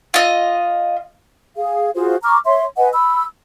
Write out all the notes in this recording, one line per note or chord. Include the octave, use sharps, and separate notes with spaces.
F4 D#5
G#4 F5
F4 F#4 G#4 C5
A#5 C#6 D6 F6
C#5 E5 C6
B4 D#5 F#5 G#5
B5 E6